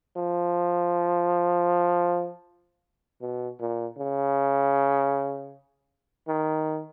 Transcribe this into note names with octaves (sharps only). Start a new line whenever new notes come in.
F3
B2
A#2
C#3
D#3